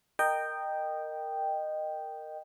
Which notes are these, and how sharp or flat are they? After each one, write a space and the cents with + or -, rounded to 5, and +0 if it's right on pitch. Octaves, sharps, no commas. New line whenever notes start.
A#4 -10 D#5 -15 G5 +0